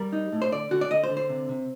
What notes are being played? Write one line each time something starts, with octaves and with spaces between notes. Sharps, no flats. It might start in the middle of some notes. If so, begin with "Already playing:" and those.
Already playing: G3 A#4
D#4
A2
C5
D3 D5
D3 F#4
D5
D3 D#5
C5
D3
C5
C3
C3